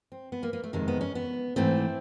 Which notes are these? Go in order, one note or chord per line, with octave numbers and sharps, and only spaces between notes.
C4
B3
A#3
A#3
A3
F2 C3 D#3 G#3
B3
C#4
B3
G#2 E3 A3 C4